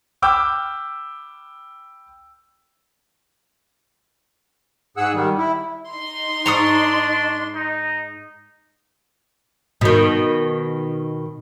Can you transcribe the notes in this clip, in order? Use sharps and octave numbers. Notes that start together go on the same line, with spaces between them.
G5 B5 D6 E6 F6 G6
G#2 G#4 F#5 E6
D#3 G3
E4
D#4 C6
G#2 D4 A#5 C#6 D#6
D#4
B2 D#3